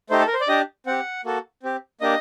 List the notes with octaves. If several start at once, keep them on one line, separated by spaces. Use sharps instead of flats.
A3 D#4 G4 C5
A4
A#4
C5
D5
D4 G4 D#5
C4 G4 F#5
A#3 F#4 A4
C4 G4
A#3 D4 G4 D#5